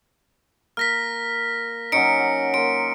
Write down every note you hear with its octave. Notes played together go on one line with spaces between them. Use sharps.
A#3 F6 A#6 B6
F#3 C#4 D#4 C#7 D7
F#5
A#3 C6 D7